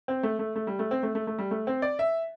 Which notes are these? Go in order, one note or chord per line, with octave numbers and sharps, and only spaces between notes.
C4
A3
A3
A3
G3
A3
C4
A3
A3
A3
G3
A3
C4
D5
E5